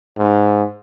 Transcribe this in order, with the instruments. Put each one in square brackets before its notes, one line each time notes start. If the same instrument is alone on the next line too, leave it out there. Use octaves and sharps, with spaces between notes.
[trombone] G#2